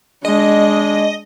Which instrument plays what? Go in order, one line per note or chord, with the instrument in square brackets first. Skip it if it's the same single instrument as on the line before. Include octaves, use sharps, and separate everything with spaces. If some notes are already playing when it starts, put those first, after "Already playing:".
[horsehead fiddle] G#3 D4 [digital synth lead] D#5